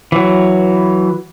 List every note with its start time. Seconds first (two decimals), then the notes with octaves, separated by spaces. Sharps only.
0.12 E3 F#3